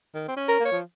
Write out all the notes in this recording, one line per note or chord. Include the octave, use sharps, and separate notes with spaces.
D#3
C4
C#4
A#4
A#3
C#5
F3